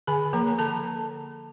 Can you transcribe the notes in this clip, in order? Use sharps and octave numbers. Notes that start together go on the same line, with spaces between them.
D3 G#4 G#5
F3 A#3 A#4 A#5
A#5
D3 A4 A5